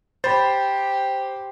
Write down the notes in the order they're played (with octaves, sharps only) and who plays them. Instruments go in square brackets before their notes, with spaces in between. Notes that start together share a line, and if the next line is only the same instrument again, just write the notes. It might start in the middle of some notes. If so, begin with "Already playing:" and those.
[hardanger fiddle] G4 [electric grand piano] C5 [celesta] B5 A6